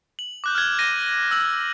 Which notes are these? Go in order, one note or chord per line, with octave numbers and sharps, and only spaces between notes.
F#7
D6 F#6 G6
F6 F#6 G#6
A#6 D#7
E6 F#7